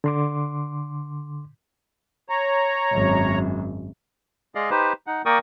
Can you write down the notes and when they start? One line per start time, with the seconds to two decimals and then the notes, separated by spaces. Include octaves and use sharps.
0.04 D3 C6 D6
2.30 C#5 A#5
2.92 G#1 F#2
4.55 G#3 G#4 D5 D#5 F5
4.70 D#4 G4 B4 C5
5.07 D#4 F#5
5.26 A#3 A#4 D5 G5 C#6 D#6